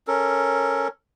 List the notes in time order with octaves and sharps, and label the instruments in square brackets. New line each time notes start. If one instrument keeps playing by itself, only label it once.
[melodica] C#4 A4 A#4